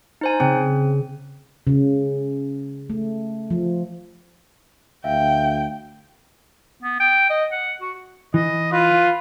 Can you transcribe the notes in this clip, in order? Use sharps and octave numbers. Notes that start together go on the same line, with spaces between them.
D#4 C5 G#5
C#3 C4
C#3
A3
F3
D2 E5 F5 G5
B3
G5
D#5
F#5
F#4
E3 D#5
F4 B4